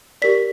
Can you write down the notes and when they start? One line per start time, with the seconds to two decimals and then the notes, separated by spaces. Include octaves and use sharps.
0.22 G4 A#4 D5 B6